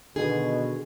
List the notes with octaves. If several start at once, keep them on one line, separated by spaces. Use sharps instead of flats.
B2 D3 D#3 G#4